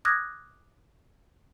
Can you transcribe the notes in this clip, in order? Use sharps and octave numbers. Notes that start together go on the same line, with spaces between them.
D6 D#6 F6 F#6 G#6 A#6